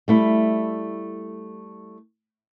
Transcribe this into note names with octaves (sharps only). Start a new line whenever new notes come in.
G3 A3 E4